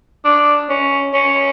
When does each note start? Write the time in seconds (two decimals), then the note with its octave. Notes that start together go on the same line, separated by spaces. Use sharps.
0.25 D4
0.69 C#4
1.14 C#4